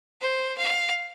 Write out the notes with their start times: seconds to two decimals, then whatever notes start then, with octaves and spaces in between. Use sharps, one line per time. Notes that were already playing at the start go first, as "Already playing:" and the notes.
0.21 C5
0.57 F5